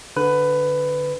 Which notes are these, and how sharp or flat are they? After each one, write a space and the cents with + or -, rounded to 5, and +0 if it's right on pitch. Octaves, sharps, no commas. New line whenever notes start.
D3 +0 B4 +15